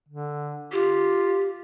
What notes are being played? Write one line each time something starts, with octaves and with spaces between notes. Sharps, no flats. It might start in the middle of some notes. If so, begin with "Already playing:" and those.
D3
F4 G4